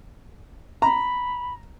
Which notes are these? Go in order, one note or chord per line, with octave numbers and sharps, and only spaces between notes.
A#5 B5